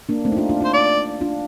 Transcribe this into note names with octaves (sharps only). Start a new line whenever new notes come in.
A#3 D4
A3 C4
D#4
D4 F4
D4 F4
D4 F4 C5
D5
D4 F4